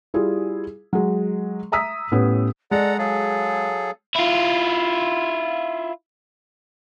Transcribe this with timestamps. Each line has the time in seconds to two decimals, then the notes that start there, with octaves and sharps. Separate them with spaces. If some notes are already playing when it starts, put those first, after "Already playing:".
0.14 G3 E4 F4 G#4
0.93 F#3 G#3
1.72 E5 A#5 D#6 E6 B6
2.12 A2 B3 C#4 G4
2.71 G#3 A4 D5 F#5 A#5
2.98 F#3 G#4 A4 F5
4.16 E4 F4